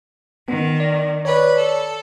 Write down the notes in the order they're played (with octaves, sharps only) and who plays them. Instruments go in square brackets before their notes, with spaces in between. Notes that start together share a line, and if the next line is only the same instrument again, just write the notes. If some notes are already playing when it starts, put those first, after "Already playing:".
[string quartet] D#3 [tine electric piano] B3
[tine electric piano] D5
[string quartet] B4 [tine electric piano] C#5 D5
[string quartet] A4